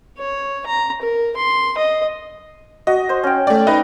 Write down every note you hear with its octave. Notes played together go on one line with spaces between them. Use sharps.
C#5
A#5
A#4
C6
D#5
F#4 D#5
C5
C#4 G5
A3 D5
D#4 B4